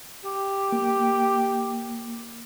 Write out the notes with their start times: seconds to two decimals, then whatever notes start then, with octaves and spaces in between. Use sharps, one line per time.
0.24 G4
0.72 A#3